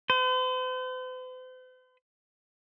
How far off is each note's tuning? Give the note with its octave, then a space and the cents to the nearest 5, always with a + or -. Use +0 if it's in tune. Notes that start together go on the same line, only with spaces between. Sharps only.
C5 -45